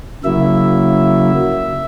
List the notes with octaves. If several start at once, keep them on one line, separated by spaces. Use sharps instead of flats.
C#3 F#3 A#3 E4 E5